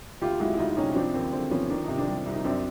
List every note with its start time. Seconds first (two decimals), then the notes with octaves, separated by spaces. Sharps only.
0.21 D2 F4 G4
0.40 G#3 E4 F#4
0.54 E4
0.58 D2 D#4 F4
0.77 C3 C#4 D#4
0.92 C#4
0.96 F3 C4 D4
1.14 D#2 C4
1.32 D3 C4
1.51 F3 B3 C#4
1.69 D#3 D4
1.84 C3 D#4
1.98 C4 D4
2.07 G3
2.26 C2
2.32 D#4
2.44 F#2 C4 D4